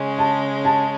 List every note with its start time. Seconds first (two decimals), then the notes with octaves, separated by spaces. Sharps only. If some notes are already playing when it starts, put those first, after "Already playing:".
Already playing: C#3 G#3 C#4
0.19 A5
0.65 A5